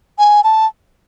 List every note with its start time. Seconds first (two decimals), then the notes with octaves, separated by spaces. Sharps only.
0.19 G#5
0.44 A5